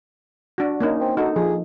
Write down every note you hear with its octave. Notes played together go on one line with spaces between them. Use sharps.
D4 F#4
A#3 C#4 D#4
C4
D#4 F#4 A4
F3 G#4